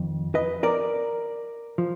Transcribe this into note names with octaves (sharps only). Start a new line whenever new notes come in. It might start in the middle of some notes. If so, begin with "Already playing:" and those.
Already playing: F2 D#3
B4 D#5
A#4 D5
F3